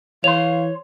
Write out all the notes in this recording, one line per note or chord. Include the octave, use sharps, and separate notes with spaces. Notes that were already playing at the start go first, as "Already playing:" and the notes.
E3 C#5 F5 C6 F7